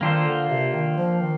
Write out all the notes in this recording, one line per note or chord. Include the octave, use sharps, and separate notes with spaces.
D#3 A#3 D4 F4 A4 C5
D3
C3
D#3
F3
D#3